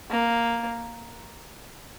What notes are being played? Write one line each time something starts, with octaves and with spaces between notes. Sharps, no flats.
A#3